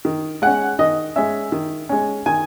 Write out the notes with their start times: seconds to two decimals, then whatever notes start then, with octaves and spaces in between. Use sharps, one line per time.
0.05 D#3
0.42 G#3 C#4 F#5
0.79 D#3 D#5
1.16 G#3 C#4 E5
1.52 D#3
1.89 G#3 C#4
2.26 D#3 G#5